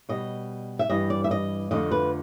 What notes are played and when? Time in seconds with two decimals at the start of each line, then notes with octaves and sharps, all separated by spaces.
0.09 B2 G3 D#5
0.79 E5
0.90 G2 E3 G3 D#5
1.10 D5
1.24 E5
1.31 D#5
1.71 F2 D3 F3 A3 D#5
1.91 B4